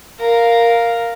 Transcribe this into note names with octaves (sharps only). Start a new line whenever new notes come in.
A#4 F5